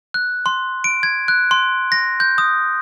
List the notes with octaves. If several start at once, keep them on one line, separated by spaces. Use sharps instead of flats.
F#6
C6
D7
G#6
F#6
C6
A#6
G6
D#6